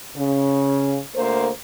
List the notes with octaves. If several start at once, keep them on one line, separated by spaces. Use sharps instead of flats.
C#3
D2 A#3 C5